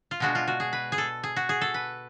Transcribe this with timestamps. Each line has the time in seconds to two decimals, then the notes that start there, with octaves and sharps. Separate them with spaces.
0.11 F4
0.20 B2 G#3 D4 F#4
0.35 F4
0.48 F#4
0.60 G#4
0.73 B4
0.92 G#4
0.98 A4
1.23 G#4
1.36 F#4
1.49 G#4
1.61 A4
1.74 B4